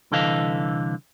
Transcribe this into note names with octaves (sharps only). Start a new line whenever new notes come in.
C2 D3 E3 A4 D#5 F5